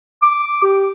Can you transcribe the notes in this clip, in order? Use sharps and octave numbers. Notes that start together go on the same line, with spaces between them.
D6
G4